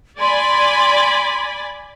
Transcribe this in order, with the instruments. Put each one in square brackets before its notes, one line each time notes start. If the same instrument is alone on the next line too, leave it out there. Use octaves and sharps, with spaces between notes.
[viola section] D5 G#5 B5 [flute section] C6